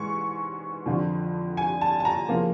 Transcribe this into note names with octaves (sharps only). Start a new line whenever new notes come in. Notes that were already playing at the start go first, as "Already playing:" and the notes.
Already playing: G#2 E3 G#3 C#6
F2 D3 F3
G#5
A5
A5
A#5
C#3 F3 A#3